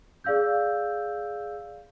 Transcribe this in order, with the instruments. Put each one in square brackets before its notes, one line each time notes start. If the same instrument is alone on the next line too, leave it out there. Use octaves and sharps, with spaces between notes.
[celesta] G#4 D5 F5 E6 G6